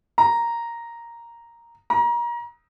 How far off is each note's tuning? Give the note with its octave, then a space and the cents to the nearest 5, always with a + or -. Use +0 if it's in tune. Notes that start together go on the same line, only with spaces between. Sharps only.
A#5 +0
A#5 +30